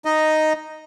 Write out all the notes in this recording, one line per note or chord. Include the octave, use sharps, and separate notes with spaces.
D#4 D#5